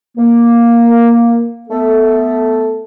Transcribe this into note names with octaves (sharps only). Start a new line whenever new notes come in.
A#3
A3 B3 A4